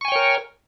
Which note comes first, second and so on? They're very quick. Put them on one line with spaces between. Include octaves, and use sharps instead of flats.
C#6 G#5 G5 C#5 A#4